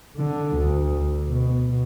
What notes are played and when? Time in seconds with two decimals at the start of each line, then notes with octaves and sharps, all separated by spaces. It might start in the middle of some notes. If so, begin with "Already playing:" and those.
0.18 D3
0.57 D2
1.28 B2